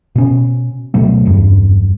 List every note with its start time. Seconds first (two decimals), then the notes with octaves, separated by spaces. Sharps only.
0.16 B2 C#4
0.94 D1 B2 F#3 A3
1.25 F#1 E2 G2